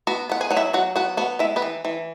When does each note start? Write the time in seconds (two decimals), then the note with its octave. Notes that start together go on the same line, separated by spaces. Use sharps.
0.07 B3 F#4
0.30 B3 F#5
0.41 G#4 G#5
0.50 F#3 F#5
0.57 E4 E5
0.73 F#3 F#4 F#5
0.96 B3 F#4 F#5
1.17 B3 F#4 F#5
1.39 G#3 E4 E5
1.56 B3 B4
1.62 E3
1.85 E3